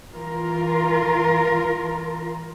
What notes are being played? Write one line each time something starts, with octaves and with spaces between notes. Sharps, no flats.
E3 F4 A#4